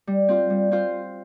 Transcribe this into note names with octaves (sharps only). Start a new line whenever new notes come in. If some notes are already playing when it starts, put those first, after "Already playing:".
G3
C4 F4 C5
G3
C4 F4 C5